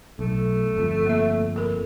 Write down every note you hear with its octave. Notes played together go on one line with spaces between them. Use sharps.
B1 A3
G1 F2
A#3 E5
A4 A#4